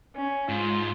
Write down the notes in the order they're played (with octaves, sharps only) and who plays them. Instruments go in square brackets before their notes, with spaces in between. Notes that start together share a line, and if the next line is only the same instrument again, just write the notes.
[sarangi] C#4
[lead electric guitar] G#2 [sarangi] F4